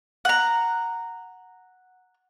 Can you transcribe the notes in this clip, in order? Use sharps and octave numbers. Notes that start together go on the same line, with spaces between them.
F#5 A#5